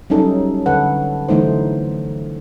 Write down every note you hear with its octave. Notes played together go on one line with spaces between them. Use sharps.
F#3 G3 C#4 D#4 A4
D3 A4 B4 F#5
D3 E3 F#3 A3 D#4 C5